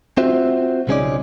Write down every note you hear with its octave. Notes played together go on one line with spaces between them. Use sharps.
C4 F4 F#4 C5 E5
B1 C#3 G#3 C#4 D#4 D5